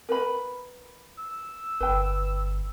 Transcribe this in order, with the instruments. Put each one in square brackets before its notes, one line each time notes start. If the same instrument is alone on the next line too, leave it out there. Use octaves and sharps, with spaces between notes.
[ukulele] A#4 B4 B5
[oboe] E6
[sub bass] G1 [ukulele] B4 G5